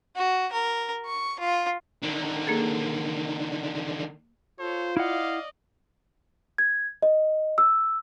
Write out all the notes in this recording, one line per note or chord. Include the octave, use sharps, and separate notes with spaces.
F#4
A#4
C#6
F4
D3 D#3
A#3 G#4 A4
F4 A4 C5 C#5
E4 D5 D#5 F5 F#5
G#6
D#5
E6